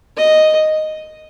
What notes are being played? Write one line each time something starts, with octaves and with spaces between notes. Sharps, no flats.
D#5